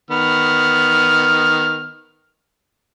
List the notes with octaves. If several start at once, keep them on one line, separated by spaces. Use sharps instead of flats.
D#3 B3 F6